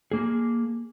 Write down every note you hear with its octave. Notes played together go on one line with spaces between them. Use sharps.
A#3 G#4